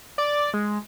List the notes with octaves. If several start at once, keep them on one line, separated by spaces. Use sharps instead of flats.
D5
G#3